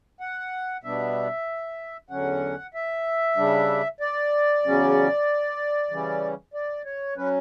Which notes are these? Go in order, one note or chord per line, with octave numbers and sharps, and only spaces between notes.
F#5
B2 G3 B3 D4 E5
E2 D3 F#3 C#4 F#5
E5
C#3 G3 D4
D5
E2 C#3 F#3 C#4
C#3 E3 G3 C#4
D5
C#5
F#3 C#4 B4